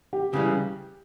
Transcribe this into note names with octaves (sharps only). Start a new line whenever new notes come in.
G4
C#2 C#3 E3 G3